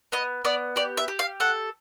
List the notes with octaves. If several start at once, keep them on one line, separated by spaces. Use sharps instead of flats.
B3 D#5
B3 D5
G4 D5
E5
G4
F5
A4 F#5